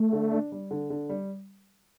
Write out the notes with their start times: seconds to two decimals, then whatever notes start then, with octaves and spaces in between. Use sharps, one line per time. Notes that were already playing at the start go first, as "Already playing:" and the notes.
Already playing: A3
0.13 D3
0.32 D4
0.52 G3
0.71 D3
0.90 D3
1.09 G3